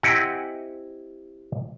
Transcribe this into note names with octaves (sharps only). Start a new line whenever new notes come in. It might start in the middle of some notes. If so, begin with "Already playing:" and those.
C4 E4 G4 D#5 F#5 G#5